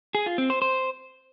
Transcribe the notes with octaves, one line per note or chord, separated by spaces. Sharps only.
G#4
F4
C4
C5
C5